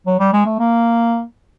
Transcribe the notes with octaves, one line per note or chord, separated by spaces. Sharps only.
F#3
G3
G#3
A3
A#3